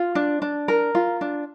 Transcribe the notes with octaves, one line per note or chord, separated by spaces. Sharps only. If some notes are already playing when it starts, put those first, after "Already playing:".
Already playing: F4
D4
D4
A#4
F4
D4